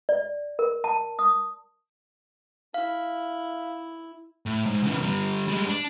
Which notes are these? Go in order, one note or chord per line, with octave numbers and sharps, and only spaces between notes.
D5
A#4
A5
D#6
E4 F5
A2
G#2
C#3 E3
D3 G3
G3 G#3
D4